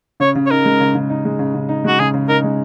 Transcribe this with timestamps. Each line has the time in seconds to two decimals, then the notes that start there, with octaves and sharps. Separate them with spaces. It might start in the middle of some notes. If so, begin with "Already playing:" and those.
0.20 C#3 C#5
0.35 C#3
0.46 C#5
0.51 D#4 A#4
0.65 G#3
0.80 C#3
0.95 C#3
1.10 D#4
1.25 G#3
1.39 C#3
1.54 C#3
1.69 D#4
1.84 G#3 F#4
1.99 C#3 G#4
2.14 C#3
2.29 D#4 A#4
2.44 G#3